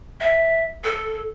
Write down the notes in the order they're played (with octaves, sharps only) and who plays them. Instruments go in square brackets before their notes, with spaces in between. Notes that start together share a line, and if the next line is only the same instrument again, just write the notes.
[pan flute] E5
A4